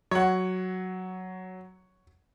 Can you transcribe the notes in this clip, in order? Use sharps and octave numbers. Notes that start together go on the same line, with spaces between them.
F#3 C#5 F#5